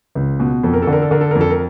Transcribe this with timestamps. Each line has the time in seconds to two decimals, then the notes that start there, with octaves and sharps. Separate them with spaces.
0.15 C#2
0.40 B2
0.64 F2 A4
0.73 A#4
0.82 A4
0.87 D3
0.93 A#4
1.02 A4
1.11 D3 A#4
1.21 A4
1.31 F2 A#4
1.41 A4
1.50 A#4